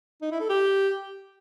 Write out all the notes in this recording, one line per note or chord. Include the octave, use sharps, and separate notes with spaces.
D#4
E4
A4
G4